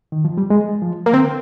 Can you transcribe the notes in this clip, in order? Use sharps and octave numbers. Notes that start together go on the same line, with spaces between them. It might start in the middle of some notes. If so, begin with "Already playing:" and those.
D#3
F3
G3
G#3
F3
A#3
D3 C4